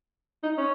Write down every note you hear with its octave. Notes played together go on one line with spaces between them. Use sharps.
D#4
C#4